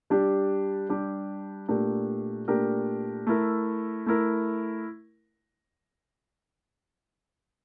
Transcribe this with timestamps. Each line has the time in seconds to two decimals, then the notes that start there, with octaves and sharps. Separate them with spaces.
0.10 G3 D4 G4
0.89 G3 D4 G4
1.69 A#2 A3 D4 G4 A#4
2.48 A#2 A3 D4 G4 A#4
3.27 A3 E4 A#4
4.06 A3 E4 A#4